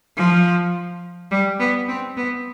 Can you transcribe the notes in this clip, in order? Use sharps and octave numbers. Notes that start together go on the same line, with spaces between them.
F3
G3
B3
C4
B3